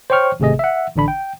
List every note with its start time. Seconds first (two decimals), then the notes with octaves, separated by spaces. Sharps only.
0.10 C5 C#5 G5 C#6 F6
0.40 G#1 C3 A3 G#4 D#5
0.59 E5 F#5
0.96 A1 D3 D4 B5
1.08 G5